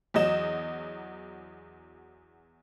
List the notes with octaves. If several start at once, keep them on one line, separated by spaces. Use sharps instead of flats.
E2 F#3 D#5 E7